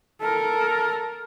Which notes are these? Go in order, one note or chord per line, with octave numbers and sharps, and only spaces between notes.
A4 A#4